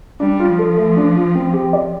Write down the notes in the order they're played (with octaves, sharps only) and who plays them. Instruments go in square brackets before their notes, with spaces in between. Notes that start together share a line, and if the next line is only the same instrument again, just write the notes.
[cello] G3 [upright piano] D4
[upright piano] F4
[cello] F3
[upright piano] A4
A3
D4
F4
C4
G4
D5